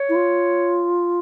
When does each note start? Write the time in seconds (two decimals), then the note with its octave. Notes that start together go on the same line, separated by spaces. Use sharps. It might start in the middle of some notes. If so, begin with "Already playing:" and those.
Already playing: C#5
0.09 E4
0.15 F4